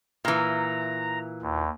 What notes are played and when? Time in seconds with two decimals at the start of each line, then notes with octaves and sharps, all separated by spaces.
0.25 A#2 E3 A#5
1.42 D#2